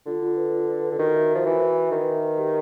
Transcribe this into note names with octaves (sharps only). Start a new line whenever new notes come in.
D3 F4
F4
B4
F4
B4
B4
D3
D#3 F#4
E5
F3 E5
E3 F#4
E5
E5
D#3 B4
E5
B4
G4